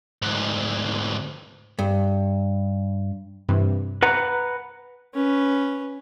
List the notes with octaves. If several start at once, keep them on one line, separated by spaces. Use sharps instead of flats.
D2 G#2
G2
G2 C3 E3
B4 F#5 A#5
C#4 B4